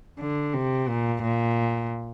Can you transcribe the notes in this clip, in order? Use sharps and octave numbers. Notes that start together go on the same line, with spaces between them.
D3
C3
A#2
A#2